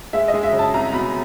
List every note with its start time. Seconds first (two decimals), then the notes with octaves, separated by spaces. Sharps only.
0.13 G#3 E5
0.28 D#5
0.34 G#3
0.43 E5
0.53 C#3
0.59 A5
0.74 C2 A#5
0.93 B2 B5